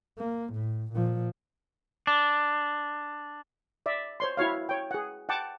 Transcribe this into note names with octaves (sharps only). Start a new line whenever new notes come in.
A#3
A2
A#2 F3
D4
D5 E5
C5 C#5 C6
E4 F#4 C#5 F5
C#5 G5
G#4 F#5
F#5 G5 A5 D6